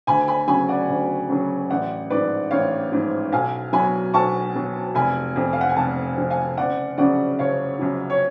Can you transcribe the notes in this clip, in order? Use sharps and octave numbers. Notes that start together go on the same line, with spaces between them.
D2 G#5 B5
G#5 B5
C#3 F#3 G#5 B5
D5 F#5
D2
C#3 F#3
A1 D5 F#5
G#2 F3 B4 D5
A1 C#5 F5
G#2 F3
B1 F5 G#5
B2 F#3 G#5 B5
B1 A5 C#6
B2 F#3
F1 G#5 B5
F2 F3
F5
F#5
G#5
F1 F#5 A5
F2 F3
F5 G#5
F#1 D5 F#5
F#2 C#3 F3 D5 F#5
F#1 C#5 F5
F#2 C#3 F3
C#5